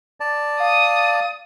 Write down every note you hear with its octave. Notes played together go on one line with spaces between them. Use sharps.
D5 A5
F5 D#6